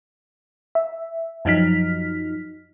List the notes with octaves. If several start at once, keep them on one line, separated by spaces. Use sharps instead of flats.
E5
F#2 F3 F#3 D#4 F6 B6